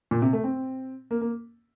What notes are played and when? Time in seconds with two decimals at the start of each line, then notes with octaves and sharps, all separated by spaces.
0.11 A#2
0.22 C3
0.33 A3
0.44 C4
1.11 A#3
1.21 A#3